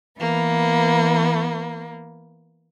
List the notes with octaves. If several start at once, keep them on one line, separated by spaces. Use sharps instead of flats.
E3 A#3 B3